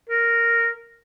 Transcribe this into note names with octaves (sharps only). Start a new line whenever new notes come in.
A#4